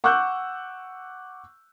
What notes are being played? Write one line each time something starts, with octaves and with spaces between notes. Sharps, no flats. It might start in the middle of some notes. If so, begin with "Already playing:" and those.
F#5 C#6 D6 E6 F#6 G6